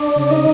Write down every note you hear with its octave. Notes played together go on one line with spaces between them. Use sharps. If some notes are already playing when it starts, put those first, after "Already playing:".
Already playing: D4 D5
C#3
D#4 D#5